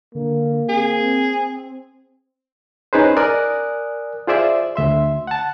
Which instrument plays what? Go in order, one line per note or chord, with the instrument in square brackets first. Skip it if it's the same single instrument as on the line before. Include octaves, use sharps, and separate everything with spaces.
[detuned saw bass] D3 [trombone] A#3
[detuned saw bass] C4 [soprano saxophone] G#4
[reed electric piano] C#4 D#4 G#4 B4 C5
A#4 D5 G#5 D#6 F#6
F4 G#4 C5 D5 E5
D2 E5 C6
F#5 A5